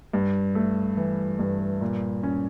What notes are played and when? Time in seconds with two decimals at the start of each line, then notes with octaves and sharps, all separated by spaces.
0.13 G2
0.55 A3
0.97 E3
1.39 G2
1.81 A#2
2.23 C#4